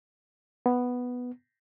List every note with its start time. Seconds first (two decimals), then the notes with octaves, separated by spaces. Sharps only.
0.66 B3